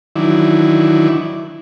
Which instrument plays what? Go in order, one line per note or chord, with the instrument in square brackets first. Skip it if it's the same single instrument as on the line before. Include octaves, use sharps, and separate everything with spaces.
[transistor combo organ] D#3 E3 F#3 D4 E4